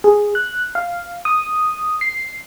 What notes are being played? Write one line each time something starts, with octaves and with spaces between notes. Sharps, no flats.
G#4
F#6
F5
D#6
C7